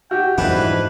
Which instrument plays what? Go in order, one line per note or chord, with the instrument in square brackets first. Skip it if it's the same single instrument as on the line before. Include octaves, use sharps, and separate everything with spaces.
[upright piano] F#4 G4 [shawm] G5
[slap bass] F2 G#2 [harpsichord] E3 D4 [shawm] B4